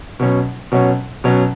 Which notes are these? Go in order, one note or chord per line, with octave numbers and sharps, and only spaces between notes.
B2 F#3 C#4
B2 F#3 C#4
B2 F#3 C#4